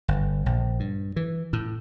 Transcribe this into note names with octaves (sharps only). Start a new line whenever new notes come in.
G1
A#1
G2
E3
A2